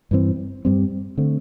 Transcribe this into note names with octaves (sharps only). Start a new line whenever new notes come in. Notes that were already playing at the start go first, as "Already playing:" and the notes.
G2 E3 C4
G2 G3 C4
D3 A3 C4